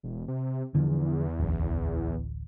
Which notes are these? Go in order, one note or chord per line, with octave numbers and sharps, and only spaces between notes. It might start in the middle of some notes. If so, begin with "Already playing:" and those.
E1
C3
E2 D3 E3 F3
D1 A1